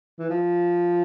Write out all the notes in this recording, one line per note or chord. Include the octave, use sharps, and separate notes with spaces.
E3
F3